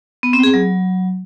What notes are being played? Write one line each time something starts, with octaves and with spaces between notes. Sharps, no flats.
B3
C4
G#4
F#3